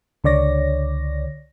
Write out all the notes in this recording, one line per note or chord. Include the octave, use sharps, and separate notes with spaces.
C#2 D3 C#5 D5 A#6